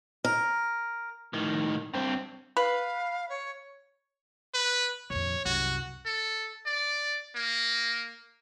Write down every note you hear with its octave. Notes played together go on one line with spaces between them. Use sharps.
A#4
A2 D#3
G2 C4
B4 F5
C#5
B4
A#1 F2 C#5
C2 F#2 F#4
A4
D5
A#3